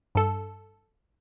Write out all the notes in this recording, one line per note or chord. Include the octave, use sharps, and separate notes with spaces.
G2 A4